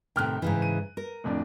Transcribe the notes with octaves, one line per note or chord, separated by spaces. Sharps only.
A2 C3 D#3 G5 F6 F#6
G#2 C#3 E3
D#7
A#4
D1 F2 D4